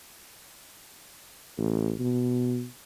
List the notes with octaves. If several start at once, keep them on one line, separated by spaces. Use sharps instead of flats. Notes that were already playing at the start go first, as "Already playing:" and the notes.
A1
B2